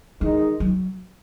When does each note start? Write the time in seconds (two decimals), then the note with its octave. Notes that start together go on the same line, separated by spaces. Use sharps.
0.21 D#3 E3 G#3 D#4
0.60 F#3